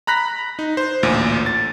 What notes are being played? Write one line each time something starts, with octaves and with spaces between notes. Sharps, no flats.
A#5 B5 F#6 A#6 B6
D#4
C5
A1 D2 A#2
A6